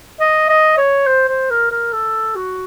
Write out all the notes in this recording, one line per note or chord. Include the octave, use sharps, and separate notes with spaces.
D#5
D#5
C#5
C5
C5
A#4
A#4
A4
F#4